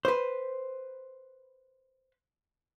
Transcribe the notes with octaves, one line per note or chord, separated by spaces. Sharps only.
B4 C5